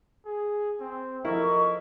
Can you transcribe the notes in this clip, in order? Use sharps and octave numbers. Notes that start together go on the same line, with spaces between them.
G#4
C4
F3 E4 A4 A#4 D#5 C#6